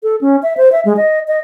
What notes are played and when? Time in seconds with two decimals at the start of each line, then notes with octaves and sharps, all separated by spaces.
0.03 A4
0.21 C#4
0.43 E5
0.57 C5
0.72 E5
0.85 G#3
0.97 D#5
1.28 D#5